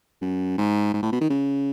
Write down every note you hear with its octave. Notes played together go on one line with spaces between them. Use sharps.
F#2
G#2
G#2
A2
B2
D#3
C#3